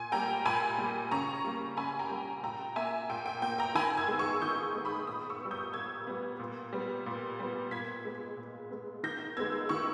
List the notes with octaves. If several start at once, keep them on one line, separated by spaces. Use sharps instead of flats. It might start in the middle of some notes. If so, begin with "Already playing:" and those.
Already playing: A#2 G#5
G3 A#3 G5 A#5
A#2 G#5 B5
G3 A#3
C#3 A#5 C#6
G3 A#3
C#3 G#5 B5
G5 A#5
G3 A#3
A#2 G5 A#5
A#3 E5 G#5
A#2 G5
G5
A#3 G5
G5 A#5
D#3 G#5 B5
E6 G#6
G#3 B3
C#6 E6
D#3 D#6 G6
G#3 B3
B5 D#6
A#2 B5 D#6
C#6 E6
G3 B3
D#6 G6
A#2 E6 G#6
G3 B3
A#2
G3 B3
A#2
G3 B3
A#2 G#6 B6
G#3 B3
A#2
G#3 B3
D#3 G6 A#6
G#3 B3 E6 G#6
D#3 C#6 E6